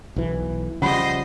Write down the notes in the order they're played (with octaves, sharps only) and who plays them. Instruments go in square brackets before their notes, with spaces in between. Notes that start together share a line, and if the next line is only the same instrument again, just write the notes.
[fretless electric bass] B1 E3
[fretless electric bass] C#3 F3 G3 [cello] C5 D#5 [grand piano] F#5 B5